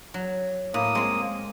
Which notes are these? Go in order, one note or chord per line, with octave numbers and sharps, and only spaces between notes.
F#3
A2 A#3 D#6
G#3 C4